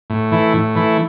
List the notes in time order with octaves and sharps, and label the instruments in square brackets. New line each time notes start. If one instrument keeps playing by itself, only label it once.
[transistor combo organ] A2
E3 A3 E4
A2
E3 A3 E4